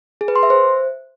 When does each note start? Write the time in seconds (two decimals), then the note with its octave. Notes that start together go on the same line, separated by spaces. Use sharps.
0.21 G#4
0.28 B4
0.36 C6
0.43 E5
0.50 C5